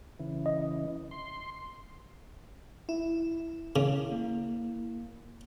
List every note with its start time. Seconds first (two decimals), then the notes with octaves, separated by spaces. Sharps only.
0.19 C#3 E3
0.46 D#5
1.11 C6
2.89 E4
3.76 C#3
4.12 A#3